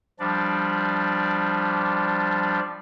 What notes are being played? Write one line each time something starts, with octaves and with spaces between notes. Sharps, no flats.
F3 G3 D4 D5